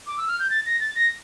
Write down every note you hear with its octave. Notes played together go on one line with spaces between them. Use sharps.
D6
E6
F6
G6
A6
A#6
A6
A#6